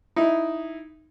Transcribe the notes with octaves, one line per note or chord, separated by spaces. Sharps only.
D#4 E4